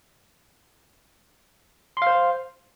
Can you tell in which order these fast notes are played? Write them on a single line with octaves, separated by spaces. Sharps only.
C6 F5 C5